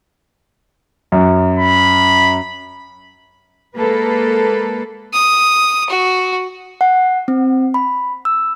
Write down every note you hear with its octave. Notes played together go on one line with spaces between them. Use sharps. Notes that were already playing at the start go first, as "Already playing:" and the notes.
F#2
B5
G#3 A#3 A4 B4
D#6
F#4
F#5
C4
B5
E6